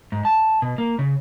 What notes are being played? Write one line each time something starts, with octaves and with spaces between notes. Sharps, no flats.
G#2
A5
B2
A#3
C#3